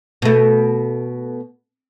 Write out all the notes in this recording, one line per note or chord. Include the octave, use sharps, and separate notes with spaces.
B2 A3